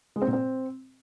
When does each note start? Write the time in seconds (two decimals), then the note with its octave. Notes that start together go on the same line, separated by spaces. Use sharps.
0.16 G#3
0.22 C4
0.27 A#2
0.33 C4